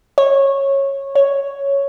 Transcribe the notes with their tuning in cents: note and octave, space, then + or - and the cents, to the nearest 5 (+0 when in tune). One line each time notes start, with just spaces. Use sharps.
C#5 -15
C#5 +0